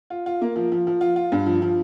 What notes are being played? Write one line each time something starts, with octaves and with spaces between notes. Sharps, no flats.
F4
F4
A#3
F3
F3
F3
F4
F4
G2
F3
F3